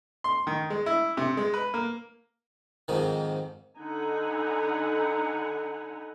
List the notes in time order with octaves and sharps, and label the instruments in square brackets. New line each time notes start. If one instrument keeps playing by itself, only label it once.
[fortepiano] C6
D#3
G#3
E4
C3
G#3
B4
A#3
[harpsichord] F2 G#2 D#3
[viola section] D3 D#4 F#5 G#5 A#5 B5